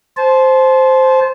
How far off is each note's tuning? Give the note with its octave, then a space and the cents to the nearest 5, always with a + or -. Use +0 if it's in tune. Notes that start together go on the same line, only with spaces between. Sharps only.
C5 +0 A5 -30